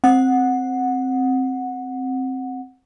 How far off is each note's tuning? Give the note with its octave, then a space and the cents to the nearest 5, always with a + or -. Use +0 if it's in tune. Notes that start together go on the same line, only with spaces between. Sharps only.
C4 +5 F#5 -10